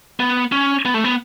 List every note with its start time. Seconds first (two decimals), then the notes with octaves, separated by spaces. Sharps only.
0.20 B3
0.52 C#4
0.85 B3
0.94 A3
1.04 B3